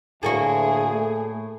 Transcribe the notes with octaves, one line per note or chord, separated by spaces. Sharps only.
D2 A2 A#3 F#4 G#4
A3